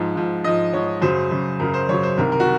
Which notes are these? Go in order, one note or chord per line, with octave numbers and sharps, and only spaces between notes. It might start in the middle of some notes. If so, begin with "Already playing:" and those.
Already playing: G#2 F3
G#2 F3
G#2 F3 D#5
G#2 F3 C#5
F#2 C#3 F#3 C5
F#2 C#3 F#3
F#2 C#3 F#3 A#4
C5
F#2 C#3 F#3 C#5
C5
C2 C3 D#3 A#4
A#4
F#4